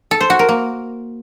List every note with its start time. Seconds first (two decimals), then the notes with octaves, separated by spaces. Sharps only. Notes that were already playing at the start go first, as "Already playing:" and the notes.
0.11 A4
0.21 C5
0.30 F#4
0.39 A#4
0.49 A#3